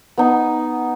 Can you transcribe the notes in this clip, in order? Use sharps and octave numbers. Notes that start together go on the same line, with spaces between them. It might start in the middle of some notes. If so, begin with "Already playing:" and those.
B3 D#4